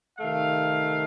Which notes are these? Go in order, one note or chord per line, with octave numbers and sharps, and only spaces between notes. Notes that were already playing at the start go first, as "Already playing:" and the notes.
C3 D#3 A3 F5